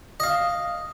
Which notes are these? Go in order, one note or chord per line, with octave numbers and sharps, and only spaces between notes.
D#5 F5